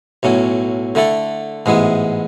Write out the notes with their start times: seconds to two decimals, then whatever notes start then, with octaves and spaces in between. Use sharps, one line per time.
0.23 B1 A2 F#3 C#4
0.95 D3 A3 E4 A4
1.66 A1 G#2 G#3 B3 E4